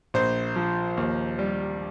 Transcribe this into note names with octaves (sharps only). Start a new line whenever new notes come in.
A#1 C5
F3
D#2
G3